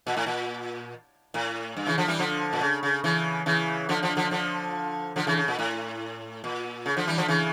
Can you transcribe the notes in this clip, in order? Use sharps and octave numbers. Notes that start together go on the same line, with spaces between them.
A#2
A2
A#2
A2
G2
C#3 E3
D3 F3
E3 G3
D3 F3
A#2
C#3
C#3
C#3 E3
C#3 E3
D3 F3
D3 F3
D3 F3
D3 F3
D3 F3
C#3 E3
C#3
A#2
A2
A#2
C#3
D3 F3
E3 G3
D3 F3
C#3 E3